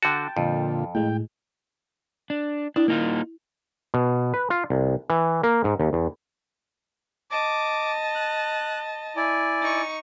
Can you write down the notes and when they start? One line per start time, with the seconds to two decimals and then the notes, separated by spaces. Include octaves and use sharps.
0.03 D3 F#4 G5 A5
0.37 F2 A#2 D3 F4
0.95 A2 G#3 G5
2.30 D4
2.76 D4 E4
2.88 A#3 D#4 F4
3.94 B2
4.34 B4
4.50 F4
4.70 C2
5.10 E3
5.43 A#3
5.64 G#2
5.80 D#2
5.93 E2
7.31 D#5 A5 D6
8.15 F#6
9.16 E4 D5 G#5
9.62 D#4 C#6